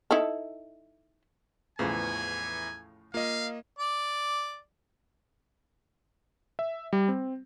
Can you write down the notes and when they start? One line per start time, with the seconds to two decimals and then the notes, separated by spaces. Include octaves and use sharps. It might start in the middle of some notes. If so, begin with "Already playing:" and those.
0.11 D#4 E4 A4
1.79 E2 A2 C#3 E3 F3 G#5
3.14 A#3 F4 D#5 F5
3.79 D5
6.59 E5
6.93 G3
7.09 C4